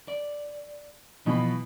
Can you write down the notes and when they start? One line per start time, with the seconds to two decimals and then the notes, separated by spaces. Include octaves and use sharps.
0.08 D5
1.26 B2 E3 F3 B5